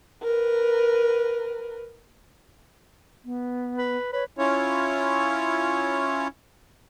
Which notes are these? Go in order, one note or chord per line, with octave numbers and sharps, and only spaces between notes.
A#4 B4
B3
B4
B4 C#5
C#4 E4 F4 C#5